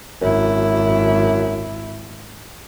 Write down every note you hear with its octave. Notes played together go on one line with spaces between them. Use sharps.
G#1 F#2 E4